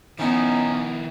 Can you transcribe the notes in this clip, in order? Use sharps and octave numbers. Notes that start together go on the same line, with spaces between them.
D#3 B3 C#4 D#4 E4